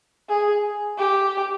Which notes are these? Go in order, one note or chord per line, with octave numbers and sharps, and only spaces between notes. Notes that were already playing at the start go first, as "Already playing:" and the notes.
G#4
G4